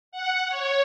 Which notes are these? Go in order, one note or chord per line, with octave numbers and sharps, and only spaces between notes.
F#5
C#5